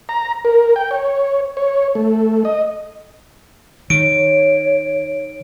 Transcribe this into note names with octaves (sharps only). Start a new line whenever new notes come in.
A#5
A#4
G5
C#5
C#5
A3
D#5
D#3 C#5 D7